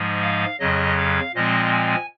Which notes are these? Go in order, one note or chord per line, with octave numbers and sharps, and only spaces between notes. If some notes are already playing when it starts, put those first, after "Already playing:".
Already playing: G#2 F3 G#3
F5
F2 C#3 F#3 D#5
F5
A#2 F3 G#3 C4 D#5
G#5